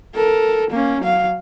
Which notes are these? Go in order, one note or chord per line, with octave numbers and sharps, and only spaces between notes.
A4 A#4
A#3 C#4
F#3 F5